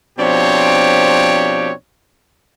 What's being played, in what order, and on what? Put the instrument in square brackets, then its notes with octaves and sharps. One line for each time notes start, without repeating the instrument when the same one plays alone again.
[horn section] B2 F3 C4 D4 G4 C#5